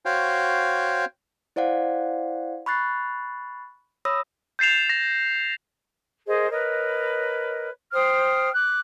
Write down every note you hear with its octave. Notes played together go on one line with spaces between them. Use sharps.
F#4 C5 C#5 F5 G5
E4 C5 D5 F5 F#5
B5 C#6 F#6 A6 C7
C#5 B5 D#6 E6 A#6
G6 A6 C7 E7 F7
A#6
G#4 A#4 C5 D#5
A#4 B4 C#5 D#5
C5 G5 D#6 F6
D6 F#6